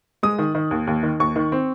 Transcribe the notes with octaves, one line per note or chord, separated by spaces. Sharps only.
G#3 D#6
D#3
D#3
D#2
D#2
D#3
D#2 C#6
D#3
C4